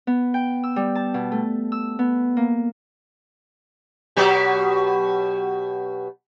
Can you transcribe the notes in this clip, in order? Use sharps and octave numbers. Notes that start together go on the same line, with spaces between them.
B3
G5
E6
G3
A5
B2
A3
E6
B3
A#3
B2 F#3 G4